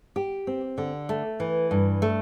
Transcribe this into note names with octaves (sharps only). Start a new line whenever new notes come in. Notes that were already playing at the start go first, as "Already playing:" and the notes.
G4
C4
D3
A3
E3
G2
A3